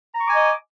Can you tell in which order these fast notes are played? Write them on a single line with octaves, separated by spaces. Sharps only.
A#5 C#6 D6 G#5 D#5